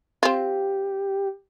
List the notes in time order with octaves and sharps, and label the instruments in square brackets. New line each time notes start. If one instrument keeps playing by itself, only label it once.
[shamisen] C4 F4 [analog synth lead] G4